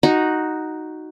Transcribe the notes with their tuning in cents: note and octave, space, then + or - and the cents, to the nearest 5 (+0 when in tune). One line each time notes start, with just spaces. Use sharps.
D#4 +0 F#4 +0